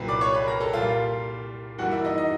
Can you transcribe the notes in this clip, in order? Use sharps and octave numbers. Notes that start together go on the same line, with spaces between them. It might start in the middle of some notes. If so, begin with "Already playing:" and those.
Already playing: C2 A#2 F#3 A#3 B4 B5
D5 D6
C#5 C#6
B4 B5
A#4 A#5
A4 A5
A#2 G3 A#3 F4 F5
G2 E3 G3 A#3 F#4 F#5
E4 E5
D#4 D#5
D#4 D#5